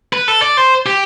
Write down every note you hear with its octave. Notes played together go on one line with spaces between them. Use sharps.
B4
A4
D5
C5
G4